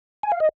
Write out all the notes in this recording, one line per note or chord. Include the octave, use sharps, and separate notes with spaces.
G#5
F5
D#5